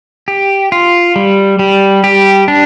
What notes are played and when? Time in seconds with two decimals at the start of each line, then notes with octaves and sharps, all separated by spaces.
0.28 G4
0.72 F4
1.16 G3
1.59 G3
2.04 G4
2.48 D4